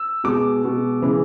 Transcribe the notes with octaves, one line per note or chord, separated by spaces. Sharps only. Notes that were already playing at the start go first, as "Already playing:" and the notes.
Already playing: E6
B2 G#3 D6
B2 G#3
C#3 E3 G#3